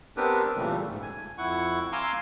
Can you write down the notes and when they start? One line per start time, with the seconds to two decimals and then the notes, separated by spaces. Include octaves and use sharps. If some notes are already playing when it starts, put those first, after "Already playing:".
0.17 B3 C4 D4 G4 A#4 B4
0.57 A#2 C#3 E3 G3 A3
0.87 G#2 A3
1.02 G#5
1.38 F2 E4 F#5 C#6
1.92 F5 G#5 A#5 C6 D6 E6